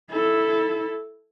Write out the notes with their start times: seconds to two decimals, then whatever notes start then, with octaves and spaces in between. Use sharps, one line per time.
0.11 E4 A4